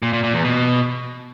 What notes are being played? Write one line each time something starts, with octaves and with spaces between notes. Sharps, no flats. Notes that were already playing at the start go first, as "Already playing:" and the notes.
A#2
A#2
A#2
E2
B2